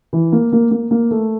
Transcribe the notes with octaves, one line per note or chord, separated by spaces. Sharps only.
E3
A#3
A#3
A#3
A#3
A3